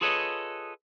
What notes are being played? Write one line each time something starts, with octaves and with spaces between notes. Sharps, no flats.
F4 G#4 A4 B4 C#5 D#5